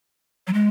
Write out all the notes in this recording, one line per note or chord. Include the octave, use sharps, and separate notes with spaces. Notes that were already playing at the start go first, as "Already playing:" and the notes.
F#3
G#3